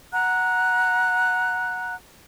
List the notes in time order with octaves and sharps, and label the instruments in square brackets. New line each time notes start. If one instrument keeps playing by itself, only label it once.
[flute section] F#5 A#5 F#6